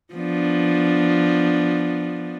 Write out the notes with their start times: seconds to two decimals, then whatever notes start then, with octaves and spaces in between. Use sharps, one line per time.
0.14 F3 B3 D4